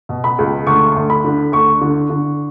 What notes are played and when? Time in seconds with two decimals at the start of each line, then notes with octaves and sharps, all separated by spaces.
0.09 B2
0.24 B5
0.39 C#2
0.67 D2 C#6
0.96 D2
1.10 B5
1.24 D3
1.52 D2 C#6
1.81 D3
2.10 D3